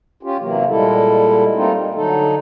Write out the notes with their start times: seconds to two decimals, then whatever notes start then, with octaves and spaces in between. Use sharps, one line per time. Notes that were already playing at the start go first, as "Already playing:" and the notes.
0.23 C#4 F4 G4
0.40 C3 E3 F#3 A#3
0.69 A#2 G3 G#3 E4 A4
1.55 G3 A3 A#3 C4 D#4 F4
1.78 G#3
1.94 D3 F#3 D#4 A4